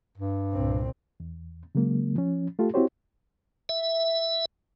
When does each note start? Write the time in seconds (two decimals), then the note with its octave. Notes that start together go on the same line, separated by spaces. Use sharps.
0.18 G2
0.53 C2 A#2 C4
1.20 E2
1.75 C#3 F#3 G#3 A#3
2.15 F3 C#4
2.59 A3 F4 G4 A4
2.74 C4 E4 F#4 G4 C5 C#5
3.69 E5